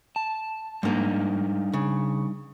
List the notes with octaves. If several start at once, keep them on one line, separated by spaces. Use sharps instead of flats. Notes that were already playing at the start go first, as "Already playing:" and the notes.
A5
G#2 G3 A#3 D4 D#4
C#3